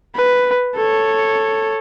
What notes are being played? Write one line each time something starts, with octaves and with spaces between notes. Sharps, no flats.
B4
A4 C#5